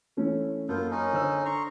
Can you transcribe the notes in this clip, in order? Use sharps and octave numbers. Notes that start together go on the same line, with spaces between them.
E3 A3 C#4
F#2 A#3 B3 F4 A4 G6
C#4 D#4
D3 C5 E6
A#5 C6 C#6